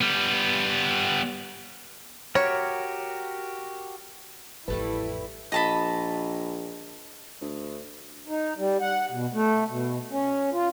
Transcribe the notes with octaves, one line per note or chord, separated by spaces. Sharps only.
G3 B3
F#4 G4 A#4 C#5
A1 F2 G3 A3 E4 B4 A5
A#1 D#5 A5 B5
D2
D#4
G3
F#5
B2
A3
B2
C#4
F4